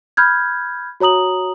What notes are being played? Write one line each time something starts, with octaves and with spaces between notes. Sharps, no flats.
B5 F6 G6 G#6
F#4 C#5 A#5 D#6 F#7